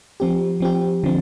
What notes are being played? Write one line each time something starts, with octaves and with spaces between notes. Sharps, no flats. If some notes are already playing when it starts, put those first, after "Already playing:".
F3 C4 G4
F3 C4 G4
D3 F3 C4